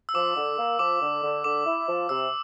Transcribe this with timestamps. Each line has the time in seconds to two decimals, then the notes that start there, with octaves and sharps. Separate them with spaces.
0.09 E6
0.14 F3 D6
0.36 D3
0.58 A#3
0.79 F3 D6
1.01 D3
1.23 D3
1.44 D3 D6
1.66 E4
1.87 F3
2.09 C3 E6